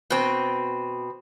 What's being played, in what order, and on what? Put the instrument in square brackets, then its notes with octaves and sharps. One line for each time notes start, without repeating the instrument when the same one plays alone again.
[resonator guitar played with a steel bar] B2 C4